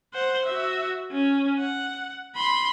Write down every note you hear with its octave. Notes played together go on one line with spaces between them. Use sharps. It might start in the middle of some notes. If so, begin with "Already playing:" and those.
C5 F#5
F#4 E5
C#4
F#5
B5 C6